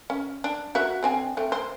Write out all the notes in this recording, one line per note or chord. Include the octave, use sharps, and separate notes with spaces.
C#4
D4
F#4 E5 F#5
D3 C4 G#5
A3 C4
C5